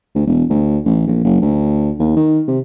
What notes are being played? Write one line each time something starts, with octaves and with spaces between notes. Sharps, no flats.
D2
E1
D2
A1
A#1
F#1
D2
D#2
D#3
C3